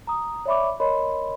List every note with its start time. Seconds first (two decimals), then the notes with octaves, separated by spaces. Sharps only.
0.07 A#5 D#6
0.46 C#5 D5 E5 B5 C#6 D6
0.80 A#4 C#5 D#5 B5 C6